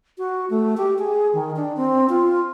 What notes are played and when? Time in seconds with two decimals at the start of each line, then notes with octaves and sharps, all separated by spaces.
0.18 F#4
0.50 A3
0.77 G4
0.99 G#4
1.33 D#3
1.56 D4
1.76 C4
2.09 F4